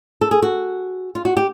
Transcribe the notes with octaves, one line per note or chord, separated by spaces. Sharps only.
A4
G#4
F#4
F4
F#4
G4